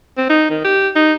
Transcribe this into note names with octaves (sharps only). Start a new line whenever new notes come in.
C4
D#4
D#3
G4
D#4